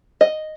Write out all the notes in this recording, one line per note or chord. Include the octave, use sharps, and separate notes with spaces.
D#5